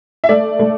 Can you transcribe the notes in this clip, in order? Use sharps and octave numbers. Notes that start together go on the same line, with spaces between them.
E5
A3 D5
A3